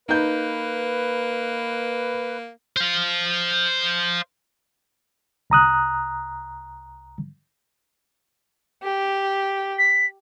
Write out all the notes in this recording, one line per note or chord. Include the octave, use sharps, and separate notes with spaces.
A#3 D#4 B4 G6
C5 F5
C2 A#5 D#6 F#6
G4
B6